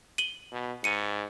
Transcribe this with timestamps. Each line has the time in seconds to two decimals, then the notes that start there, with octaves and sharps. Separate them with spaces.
0.18 D#7 F#7 G7
0.52 B2
0.84 G#2 C#7 D#7